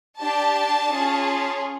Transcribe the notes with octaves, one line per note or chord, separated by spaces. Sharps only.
D4 G4 A5
C#4 F4 G#4